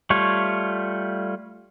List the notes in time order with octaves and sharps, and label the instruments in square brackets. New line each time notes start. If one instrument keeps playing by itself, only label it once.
[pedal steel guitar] G3 A3 F4 C#5